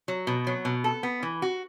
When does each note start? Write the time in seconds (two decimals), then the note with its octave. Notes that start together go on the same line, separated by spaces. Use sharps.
0.08 F#3
0.27 B2
0.47 F#3
0.65 B2
0.84 A4
1.03 B3
1.23 E3
1.42 F#4